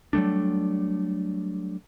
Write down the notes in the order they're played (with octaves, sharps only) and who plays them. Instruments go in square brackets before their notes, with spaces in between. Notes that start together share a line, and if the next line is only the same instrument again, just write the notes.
[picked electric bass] F#3 G3 A3 D4